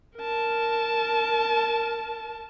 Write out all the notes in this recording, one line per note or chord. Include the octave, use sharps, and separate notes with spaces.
A#4 A5